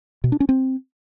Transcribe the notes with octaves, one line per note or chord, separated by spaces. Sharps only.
B2
D4
C#4
C4